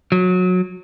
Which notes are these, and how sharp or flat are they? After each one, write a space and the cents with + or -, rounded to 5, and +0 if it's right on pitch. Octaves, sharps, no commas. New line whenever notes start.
F#3 -20